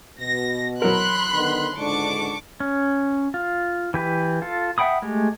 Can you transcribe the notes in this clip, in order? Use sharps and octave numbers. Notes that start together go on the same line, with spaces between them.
B2 A#6
F#3 A#4 B5 C6 F#6
D3 D#3 B3
C#2 G#2 D3 D4 C#6 D6
C#4
F4
E3 G4 B4
F4 A4
E5 F#5 G5 B5 D#6
G#3 A3 G4